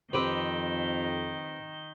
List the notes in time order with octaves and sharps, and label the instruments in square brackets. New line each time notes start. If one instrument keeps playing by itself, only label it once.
[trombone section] F2 [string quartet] D#3 G6 [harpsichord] C4 G4 B4